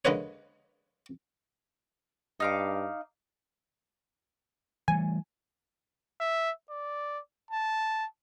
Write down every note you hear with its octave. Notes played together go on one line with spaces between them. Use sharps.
D3 G#3 A#3 B4 C#5
G2 D#4 F5 D6
E3 G3 A3 G#5
E5
D5
A5